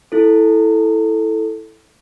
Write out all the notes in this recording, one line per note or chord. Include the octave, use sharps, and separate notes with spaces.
E4 A4